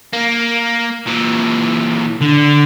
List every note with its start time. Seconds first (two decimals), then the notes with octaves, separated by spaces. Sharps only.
0.13 A#3
1.07 A#2 E3
2.21 D3